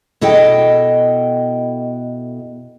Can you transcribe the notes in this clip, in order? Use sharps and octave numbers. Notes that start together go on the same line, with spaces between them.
B2 E4 A4 D#5 G5